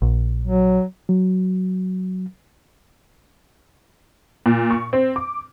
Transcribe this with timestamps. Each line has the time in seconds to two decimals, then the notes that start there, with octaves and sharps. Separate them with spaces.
0.02 A#1
0.43 F#3
1.09 F#3
4.46 A#2
4.71 C#6
4.93 C4
5.16 D6